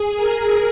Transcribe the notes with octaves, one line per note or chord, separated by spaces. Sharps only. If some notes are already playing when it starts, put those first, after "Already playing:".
Already playing: G#4
A#4